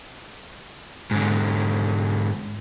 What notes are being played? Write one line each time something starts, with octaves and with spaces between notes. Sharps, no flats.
G#2 D3